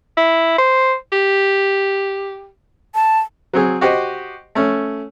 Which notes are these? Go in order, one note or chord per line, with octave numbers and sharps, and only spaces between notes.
E4
C5
G4
A5
F#3 C4 G#4
F#4 G4 C5 D#5
A3 C#4